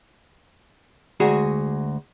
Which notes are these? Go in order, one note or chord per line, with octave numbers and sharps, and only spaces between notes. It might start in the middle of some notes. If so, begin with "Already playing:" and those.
D2 G#3 F#4 G#4